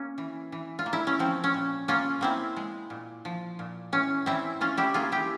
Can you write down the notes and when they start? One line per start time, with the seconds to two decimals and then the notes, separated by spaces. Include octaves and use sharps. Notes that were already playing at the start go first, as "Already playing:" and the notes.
Already playing: A#3 C#4
0.18 E3
0.52 E3
0.79 F4
0.86 A#3
0.93 E4
1.07 C#4
1.19 F3 C4
1.44 C#4
1.54 A#2
1.88 A#3 C#4 F4
2.21 A#3 C4 E4
2.56 G#3
2.90 A#2
3.25 F3
3.59 A#2
3.92 E3 C#4
4.26 E3 C4 E4
4.61 E3 C#4 F4
4.77 E4 G4
4.94 A#3 F4 G#4
5.12 E4 G4